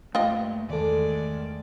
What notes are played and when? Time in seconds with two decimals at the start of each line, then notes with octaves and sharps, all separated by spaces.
0.15 G2 A3 A#3 F4 G4 D#5
0.69 E2 A2 D#3 G#3 A4 D5